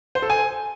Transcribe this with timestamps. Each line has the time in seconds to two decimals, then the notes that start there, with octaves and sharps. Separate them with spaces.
0.15 C5
0.22 A4
0.30 G#5